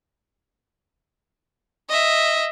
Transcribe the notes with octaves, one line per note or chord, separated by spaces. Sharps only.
D#5 E5